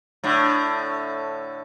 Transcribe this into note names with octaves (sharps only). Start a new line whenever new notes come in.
A2 D3